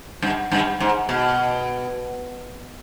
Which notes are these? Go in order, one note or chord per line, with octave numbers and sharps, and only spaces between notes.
G2
G2
G#2
B2